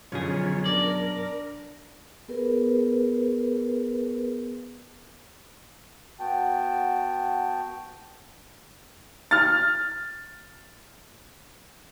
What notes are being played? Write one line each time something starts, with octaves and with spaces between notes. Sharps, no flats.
B1 F#2 D3 F3 C#4 G#4
D4 A#4 D5
B3 G#4 A#4 B4
B3 F#4 G5 A5
F6 A6